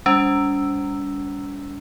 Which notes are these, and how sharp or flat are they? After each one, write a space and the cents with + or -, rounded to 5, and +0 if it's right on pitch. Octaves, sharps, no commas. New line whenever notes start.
G3 +30 C#4 +45